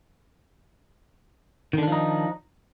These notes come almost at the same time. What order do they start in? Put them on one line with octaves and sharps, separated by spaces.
D#3 D3 D4 F3 D#4